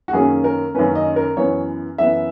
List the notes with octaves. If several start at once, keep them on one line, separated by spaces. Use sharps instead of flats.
F#4
F#2 D#3 A#3 C#4 G#4
A#4
F#2 D#3 A#3 C#4 B4
D#5
A#4
F#2 E3 B3 C#5
F#2 E3 B3 E5